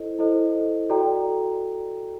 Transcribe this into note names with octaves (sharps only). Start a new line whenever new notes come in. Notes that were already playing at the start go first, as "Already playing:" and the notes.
Already playing: E4 A4 C5 D#5
E4 A4 C5 D#5
F#4 A4 D5 G5 A#5